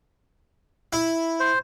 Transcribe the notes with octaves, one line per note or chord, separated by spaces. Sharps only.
E4
C5